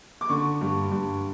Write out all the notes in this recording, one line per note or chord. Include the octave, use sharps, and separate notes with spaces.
D6
D3 C#6
G2
G2